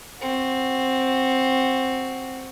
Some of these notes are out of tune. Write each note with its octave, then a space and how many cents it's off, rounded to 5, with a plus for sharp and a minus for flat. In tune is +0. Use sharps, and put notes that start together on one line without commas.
C4 +5 F#4 +0